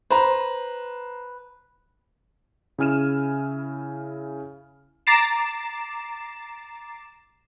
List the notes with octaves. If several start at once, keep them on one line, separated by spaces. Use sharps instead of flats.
B4 C5 A#5
C#3 E4 G#5 F6 D#7 E7
A#5 D6 A6 C7 E7